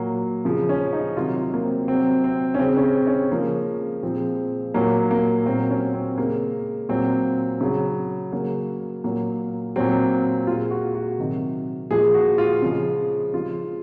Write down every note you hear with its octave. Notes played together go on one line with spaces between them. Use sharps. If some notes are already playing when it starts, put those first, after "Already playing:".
Already playing: A#2 F#3 A#3
C#3 F3 G#3
C#4
D#4
C3 D#3 F#3 F4
F4
A#3
C4
C3 F#3 C4
C4
C#4
C#3 G#3 C4
C#4
C4
C#4
C#3 F3 G#3 A#3
A#2 F3 G#3 C4
A#2 F#3 A#3
A#3
A#2 F#3 C4
C#4
C4
C#3 G#3 A#3
A#2 F#3 C4
C#3 F#3
C#3 F#3 A#3
A#2 F#3 A#3
A#2 F#3 C4
A#2 G#3 F4
F#4
F#4
C3 D#3 F#3
A#2 F3 G#3 G#4
F#4
F4
C#3 F3 G#3
C#3 F3 G#3 F4